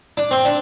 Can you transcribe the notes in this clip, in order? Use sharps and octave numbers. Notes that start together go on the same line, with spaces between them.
D4
C4
D4